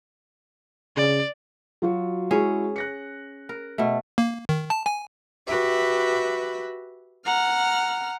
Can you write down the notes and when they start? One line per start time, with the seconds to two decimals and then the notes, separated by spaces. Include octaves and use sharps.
0.97 C#3 D5
1.82 F#3 F4 F#4
2.31 G#3 C#4 E4 F#4 G#4
2.76 F#6 A#6 C#7
3.49 A#4
3.78 B2 A3
4.18 A#3
4.49 D#3
4.70 A5
4.86 G#5
5.48 F#4 G4 B4 E5
7.25 F#5 A#5 F6